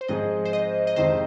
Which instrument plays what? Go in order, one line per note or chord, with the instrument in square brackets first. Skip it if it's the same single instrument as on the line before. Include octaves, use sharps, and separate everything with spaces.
[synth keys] C5
[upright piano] G#2 F3 C4 G#4 [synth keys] D#5
[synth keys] C5
D#5
D#5
[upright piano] F2 C3 D#3 G#3 D#4 [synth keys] C5